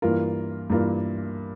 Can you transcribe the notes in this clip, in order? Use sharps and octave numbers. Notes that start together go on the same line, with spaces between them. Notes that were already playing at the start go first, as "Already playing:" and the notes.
G2 E3 A#3 F4 A#4
G2 E3 A#3 F4 A#4